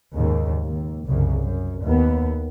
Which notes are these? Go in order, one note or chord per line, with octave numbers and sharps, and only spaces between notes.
D#2 G#2 C#3
D#2
C2 F#2 C#3
F#2
D#2 B3